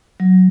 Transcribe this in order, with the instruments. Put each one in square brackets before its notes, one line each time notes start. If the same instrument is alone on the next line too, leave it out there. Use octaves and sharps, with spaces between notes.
[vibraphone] F#3